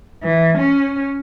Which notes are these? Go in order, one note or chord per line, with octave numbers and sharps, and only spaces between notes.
E3
C#4